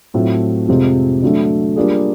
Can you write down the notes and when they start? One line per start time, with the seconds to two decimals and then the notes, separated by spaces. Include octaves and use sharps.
0.14 A2 F#3 A3 C4 F4
0.68 F2 C3 F3 G#3 C4
1.22 D3 F#3 A3
1.76 G3 A#3 D4 F4 G#4